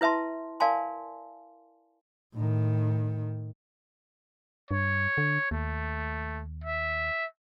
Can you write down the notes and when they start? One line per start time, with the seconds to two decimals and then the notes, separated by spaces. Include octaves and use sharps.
0.01 E4 B4 E5 A5 C6
0.60 A#4 D5 F5 G#5 A5 C6
2.34 A2 D#3
4.71 G2 C#5
5.18 D3
5.51 D#2 A3
6.64 E5